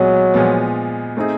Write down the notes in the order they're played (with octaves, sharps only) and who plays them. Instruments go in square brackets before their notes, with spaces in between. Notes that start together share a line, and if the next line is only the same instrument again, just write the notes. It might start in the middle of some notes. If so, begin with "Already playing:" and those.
Already playing: [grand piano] A#2 G#3 B3 [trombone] F#3
[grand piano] A#2 F3 G#3 B3
A3 C4 D#4 G#4